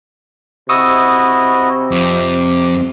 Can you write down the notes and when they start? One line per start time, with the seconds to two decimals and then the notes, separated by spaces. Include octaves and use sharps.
0.69 C3 E4 F#4 D#5 C#6 D#6 E6
1.91 F2 D6